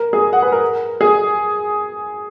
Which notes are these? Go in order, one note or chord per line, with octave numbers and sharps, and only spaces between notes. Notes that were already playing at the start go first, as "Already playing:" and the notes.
Already playing: A#4
G#4
F#5
B4
A#4
G#4